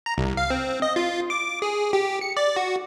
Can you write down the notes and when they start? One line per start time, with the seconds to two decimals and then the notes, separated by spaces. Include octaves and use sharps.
0.06 A#5
0.18 C2
0.37 F5
0.50 C4
0.82 D#5
0.96 F4
1.30 D6
1.62 G#4
1.93 G4
2.21 C#7
2.37 D5
2.56 F#4